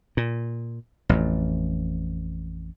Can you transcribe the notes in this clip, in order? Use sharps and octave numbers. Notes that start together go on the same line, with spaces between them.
A#2
A1 F2